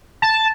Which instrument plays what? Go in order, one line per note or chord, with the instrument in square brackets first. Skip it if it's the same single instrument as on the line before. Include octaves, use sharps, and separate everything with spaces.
[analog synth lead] A5